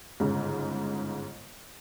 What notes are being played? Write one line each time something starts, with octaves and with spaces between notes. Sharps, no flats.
G1 G#2 C#3